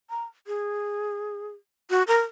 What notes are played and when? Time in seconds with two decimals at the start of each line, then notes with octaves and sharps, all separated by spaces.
0.10 A#5
0.47 G#4
1.90 F#4
2.08 A#4